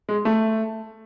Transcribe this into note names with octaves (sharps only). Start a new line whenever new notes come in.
G#3
A3